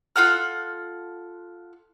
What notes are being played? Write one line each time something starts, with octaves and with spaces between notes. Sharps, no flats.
F4 A4 F#5 F6